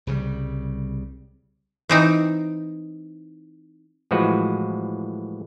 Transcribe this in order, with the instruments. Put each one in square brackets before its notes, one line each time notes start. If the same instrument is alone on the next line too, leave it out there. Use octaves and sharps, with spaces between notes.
[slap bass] C2 C#3 E3 G3
[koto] E3 C4 D#4
[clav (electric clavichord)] A2 E3 F3 G#3 F#4 B4